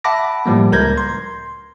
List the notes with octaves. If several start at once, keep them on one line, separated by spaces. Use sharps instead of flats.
E5 F#5 A5 B5 D6 A#6
A2 F3 G3 A#3
C#2 A#4 A#5 G6 G#6 A#6
C6